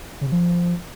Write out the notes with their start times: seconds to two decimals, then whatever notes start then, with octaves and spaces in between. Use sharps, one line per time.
0.21 C#3
0.27 C3
0.32 F3